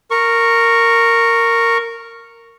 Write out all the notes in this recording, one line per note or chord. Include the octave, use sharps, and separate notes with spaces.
A#4 C#6